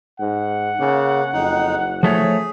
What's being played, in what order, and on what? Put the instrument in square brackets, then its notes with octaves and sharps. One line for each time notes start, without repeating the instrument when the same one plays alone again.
[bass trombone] G#2 [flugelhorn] F#5
[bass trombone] C#3 [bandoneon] A#3
[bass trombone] F#1 [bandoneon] F2 D#4
[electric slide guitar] F3 A3 C#5 [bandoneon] G#4